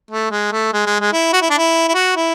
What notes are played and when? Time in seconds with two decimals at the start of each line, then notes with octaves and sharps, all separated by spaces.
0.11 A3
0.31 G#3
0.52 A3
0.73 G#3
0.86 G#3
1.00 G#3
1.13 E4
1.33 F#4
1.42 E4
1.50 D4
1.58 E4
1.88 E4
1.95 F#4
2.16 E4